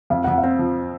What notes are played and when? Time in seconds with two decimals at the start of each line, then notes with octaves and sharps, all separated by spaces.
0.10 F2 F5
0.24 F2 F#5
0.38 F5
0.43 C4
0.59 F3